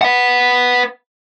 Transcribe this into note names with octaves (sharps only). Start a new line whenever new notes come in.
B4 F#5